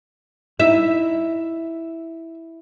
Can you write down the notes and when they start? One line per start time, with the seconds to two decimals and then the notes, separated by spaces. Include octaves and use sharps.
0.60 D#4 E4 E5